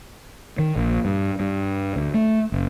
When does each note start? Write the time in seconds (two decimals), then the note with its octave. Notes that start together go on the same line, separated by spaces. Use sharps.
0.59 D#3
0.76 A#1
1.05 G2
1.40 G2
1.96 D2
2.14 A3
2.52 F#1